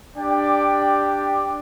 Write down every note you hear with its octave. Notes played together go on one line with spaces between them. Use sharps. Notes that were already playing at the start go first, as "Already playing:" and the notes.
D4 G4 D5 G5